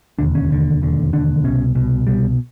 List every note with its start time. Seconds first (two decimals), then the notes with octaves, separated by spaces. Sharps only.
0.19 E1 D#2 D3 D4
0.35 C#4
0.50 E1 D#2 D3
0.82 E1 D#2 D3
1.13 E1 D#2 D3 D4
1.44 C2 B2 C#4
1.75 C2 B2
2.07 C2 B2 G3